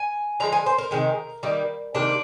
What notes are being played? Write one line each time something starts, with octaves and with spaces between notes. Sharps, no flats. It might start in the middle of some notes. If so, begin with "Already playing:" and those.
Already playing: G#5
D3 F3 G#3 A#5
G#5
C5
A#4
C3 D#3 G#3
D#3 G3 A#3
C3 D#3 G3 A#3 D4